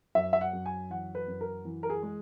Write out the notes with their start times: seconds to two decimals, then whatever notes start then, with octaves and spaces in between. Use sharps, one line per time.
0.15 F#2 E5
0.33 E5
0.41 F#5
0.53 F#2
0.66 G#5
0.90 E3 F#5
1.15 B4
1.28 F#2
1.41 A#4
1.65 E3
1.83 A#4
1.90 G#4
2.03 G#3